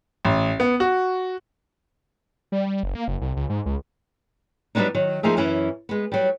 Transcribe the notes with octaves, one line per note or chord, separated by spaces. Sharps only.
A1
B3
F#4
G3
G3
F#1
A#3
F#1
C2
C#2
G#2
C#2
F#3 G3 A#3 B3 D4 D#4
D#3 F#3
F3 A#3 D#4 G#4 E5
F#2 E3 C#4 E4
G#3 B3
F#3 G3